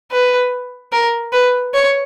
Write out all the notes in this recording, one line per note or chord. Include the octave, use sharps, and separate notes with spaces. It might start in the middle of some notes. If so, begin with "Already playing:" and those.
B4
A#4
B4
C#5